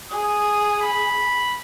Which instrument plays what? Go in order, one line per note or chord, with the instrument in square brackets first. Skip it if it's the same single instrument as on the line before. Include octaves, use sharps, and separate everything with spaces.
[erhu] G#4 [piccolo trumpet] D#6
[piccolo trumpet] B5